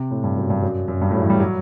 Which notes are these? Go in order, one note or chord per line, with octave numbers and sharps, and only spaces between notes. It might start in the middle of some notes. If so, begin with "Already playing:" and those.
Already playing: C3
A2
G2
F#2
G2
F#2
F#2
G2
A2
F#3
E3
G3
F#3